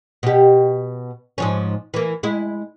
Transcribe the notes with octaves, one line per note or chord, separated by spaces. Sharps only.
B2 G4
G#2 F3 C#4
E3 A#3
G#3 E4